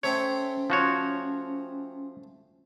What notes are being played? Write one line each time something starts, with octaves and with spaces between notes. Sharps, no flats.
A3 C4 C#4 C#5 G5
F3 F#4 C#5